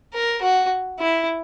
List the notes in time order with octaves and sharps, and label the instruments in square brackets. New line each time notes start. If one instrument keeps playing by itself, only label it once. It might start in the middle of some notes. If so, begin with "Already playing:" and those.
[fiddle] A#4
F#4
E4